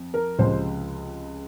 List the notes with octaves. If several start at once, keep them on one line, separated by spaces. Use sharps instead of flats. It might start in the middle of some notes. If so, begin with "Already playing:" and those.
Already playing: F2
A#4
C#2 C3 F3 G#3 C5